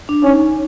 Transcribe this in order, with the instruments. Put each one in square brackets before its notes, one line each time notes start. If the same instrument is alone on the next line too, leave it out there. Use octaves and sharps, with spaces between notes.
[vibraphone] D4
[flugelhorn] C#4 [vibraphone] D#4